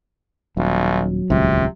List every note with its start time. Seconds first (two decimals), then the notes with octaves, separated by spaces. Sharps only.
0.57 D#1 B1 F#3
1.30 D#1 C#2 C3